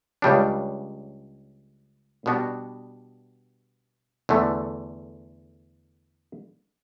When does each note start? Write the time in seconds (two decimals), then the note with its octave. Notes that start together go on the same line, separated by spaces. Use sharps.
0.22 C#2 C#3 G3 D4
2.26 B2 G3 B3 D4 F#4
4.29 E2 D3 A3